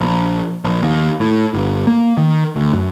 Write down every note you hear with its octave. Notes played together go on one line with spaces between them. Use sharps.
A#1
A#1
D#2
A2
G1
A#3
D#3
D2
F#2